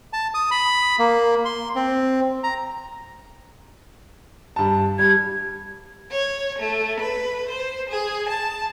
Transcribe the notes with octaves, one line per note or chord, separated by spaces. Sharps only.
A5
D#6
B5
A#3
C6
C4
A#5
G2 A5
G3 G#6
C#5
A3
B4
C5
G#4
A5